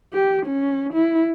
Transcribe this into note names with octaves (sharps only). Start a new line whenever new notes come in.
G4
C#4
E4